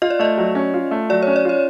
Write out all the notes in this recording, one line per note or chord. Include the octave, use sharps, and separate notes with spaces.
F4 D#5
D5
A3 D#5
F#3
C#4
F4
A3
F#3 D5
C#4 C#5
D5
F4 C#5